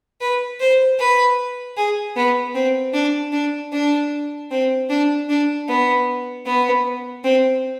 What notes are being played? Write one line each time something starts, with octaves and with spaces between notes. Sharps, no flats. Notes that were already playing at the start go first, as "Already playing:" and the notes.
B4
C5
B4
G#4
B3
C4
D4
D4
D4
C4
D4
D4
B3
B3
C4